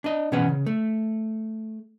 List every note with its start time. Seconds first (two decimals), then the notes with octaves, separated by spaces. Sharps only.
0.04 D4 D#5
0.32 B2 E3 C#4 B4 F#5
0.49 C#3
0.66 A3